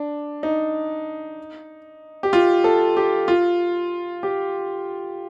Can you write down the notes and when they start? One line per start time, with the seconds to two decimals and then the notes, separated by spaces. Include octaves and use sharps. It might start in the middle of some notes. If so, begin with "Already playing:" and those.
Already playing: D4
0.43 D#4
2.23 G4
2.33 F4
2.64 A4
2.97 G4
3.28 F4
4.23 G4